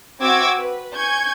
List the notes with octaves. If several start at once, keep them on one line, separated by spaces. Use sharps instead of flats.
C4 F#4 E5 D6 E6 G#6
B4
G#5 C#6 G6 G#6